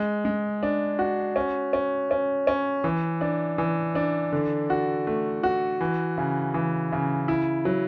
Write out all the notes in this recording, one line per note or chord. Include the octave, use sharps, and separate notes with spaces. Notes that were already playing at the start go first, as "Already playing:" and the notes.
Already playing: G#3
G#3
D4
F#4
C#4
C#4
C#4
C#4
E3
D4
E3
D4
D3
F#4
A3
F#4
E3
C#3
E3
C#3
E4
F#3